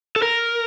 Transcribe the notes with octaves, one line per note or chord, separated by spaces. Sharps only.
A4
A#4